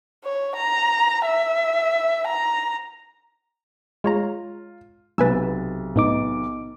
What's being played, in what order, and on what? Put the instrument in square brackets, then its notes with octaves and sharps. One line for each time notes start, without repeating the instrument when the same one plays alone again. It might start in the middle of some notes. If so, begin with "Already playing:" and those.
[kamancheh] C#5
A#5
E5
A#5
[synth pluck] G#3 C#5 A#5 [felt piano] F4
[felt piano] B1 C3 A6 [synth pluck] B4 G#5 E6
[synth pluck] A2 [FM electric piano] B3 D#4 D6